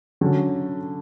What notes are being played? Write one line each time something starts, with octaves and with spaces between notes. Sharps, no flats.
D3 F#3 C#4